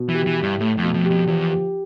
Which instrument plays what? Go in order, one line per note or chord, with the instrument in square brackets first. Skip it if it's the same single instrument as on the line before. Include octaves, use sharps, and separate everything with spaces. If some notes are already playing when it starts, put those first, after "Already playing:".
Already playing: [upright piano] B2
[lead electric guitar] E3
[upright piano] G4
[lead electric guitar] E3
[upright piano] E4
[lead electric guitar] G2
[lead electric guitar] A2 [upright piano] A3
[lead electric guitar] F2
[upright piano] B2
[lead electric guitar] F2
[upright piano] G4
[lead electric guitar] F2
[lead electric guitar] E2 [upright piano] F3
[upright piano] G4